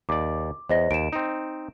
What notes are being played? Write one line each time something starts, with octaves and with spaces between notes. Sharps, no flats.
D#2 D5 D6
E2 C5 D#5 A#6
D#2 D7 E7
C4 D#4